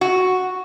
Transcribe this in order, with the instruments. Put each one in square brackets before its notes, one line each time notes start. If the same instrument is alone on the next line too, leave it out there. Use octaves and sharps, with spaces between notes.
[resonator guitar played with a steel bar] F#4